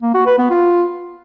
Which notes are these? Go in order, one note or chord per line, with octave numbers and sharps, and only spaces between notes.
A#3
F#4
B4
B3
F4